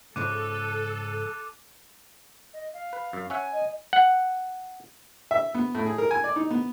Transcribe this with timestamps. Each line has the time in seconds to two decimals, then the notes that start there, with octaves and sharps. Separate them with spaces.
0.16 G#2 C#3 F3 A4 D6 F#6 D#7
2.54 D#5
2.73 F5
2.93 B4
3.13 F#2
3.30 C#4 E5 F#5 G#5
3.53 D#5
3.93 F#5
5.31 E5
5.54 B3
5.75 A2
5.86 G#4
5.98 A#4
6.11 G#5
6.24 D5
6.36 D#4
6.50 B3